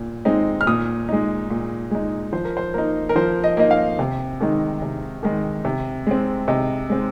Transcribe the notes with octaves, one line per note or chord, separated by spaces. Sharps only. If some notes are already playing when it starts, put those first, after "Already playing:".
Already playing: A#2
G#3 C4 D#4
F6
A#2 D#6
G#3 D#4
A#2
G#3 D#4
F3 C5
A#4
C5
A#3 D#4 A#4
A#4
F3 C5
D#5
A#3 D#4 D#5
F5
C3
D#3 G#3 D#4
C3
D#3 G#3 D#4
C3
G#3 C4
C3 D#5
G#3 C4